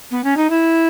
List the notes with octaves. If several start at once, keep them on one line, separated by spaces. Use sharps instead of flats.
B3
C#4
D#4
E4